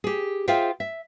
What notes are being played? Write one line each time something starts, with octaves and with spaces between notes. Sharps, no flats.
G4 G#4
F4 G#4 C5 E5 F5 G5
E5